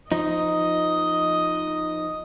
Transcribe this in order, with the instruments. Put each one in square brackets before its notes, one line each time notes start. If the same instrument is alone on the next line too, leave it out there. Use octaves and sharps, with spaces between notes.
[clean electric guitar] F3 D#4 [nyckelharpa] D#5 D#6